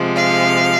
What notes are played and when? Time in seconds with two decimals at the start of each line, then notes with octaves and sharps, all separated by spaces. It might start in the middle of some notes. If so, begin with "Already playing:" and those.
Already playing: C3 F3 G#3
0.15 F5